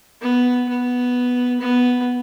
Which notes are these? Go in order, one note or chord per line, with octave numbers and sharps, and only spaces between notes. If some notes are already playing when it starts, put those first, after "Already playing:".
B3
B3
B3